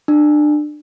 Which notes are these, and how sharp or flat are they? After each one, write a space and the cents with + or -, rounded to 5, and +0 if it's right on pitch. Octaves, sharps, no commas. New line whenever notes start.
D4 +25